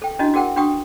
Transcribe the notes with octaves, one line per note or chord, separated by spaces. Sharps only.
A4 G5
C#4 D4 E4 F#4 D#5
F#4 G#4 A#4 F#5 G5
D4 F#4 G5 C#6 D#6